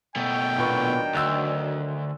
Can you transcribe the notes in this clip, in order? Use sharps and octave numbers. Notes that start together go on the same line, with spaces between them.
B2 A3 G5
A#2 D#3 F#3 B3 D4 C#6
D2 E6 F#6